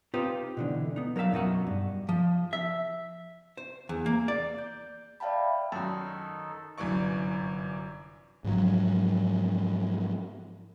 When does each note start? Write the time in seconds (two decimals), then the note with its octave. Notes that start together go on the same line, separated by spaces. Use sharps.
0.14 C4 D#4 F4 G4 B4 C5
0.57 B2 D3 E3
0.96 B3 D#4
1.16 F#3 A#4 C5 E5 F5
1.32 F#2 B2 D#4 F#4
1.67 G2
2.09 F3
2.53 E5
3.57 C5
3.89 E2
4.06 A#3
4.28 D5
4.58 G6
5.20 D5 E5 F5 G5 A5 B5
5.72 F#2 D#3 D#4 F#4 A4 A5
6.78 G1 F#2 C3 E3 D5 C#6
8.44 G#2 F3 F#3